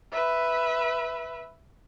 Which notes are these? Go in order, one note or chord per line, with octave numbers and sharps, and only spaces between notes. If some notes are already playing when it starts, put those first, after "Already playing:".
B4 E5